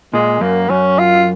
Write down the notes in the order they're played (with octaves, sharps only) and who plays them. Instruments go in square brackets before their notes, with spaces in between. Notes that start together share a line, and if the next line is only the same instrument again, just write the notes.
[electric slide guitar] A#2 [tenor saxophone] G#3
[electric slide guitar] F#2 [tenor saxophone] A#3
[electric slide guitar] F#2 [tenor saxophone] C#4
[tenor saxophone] F4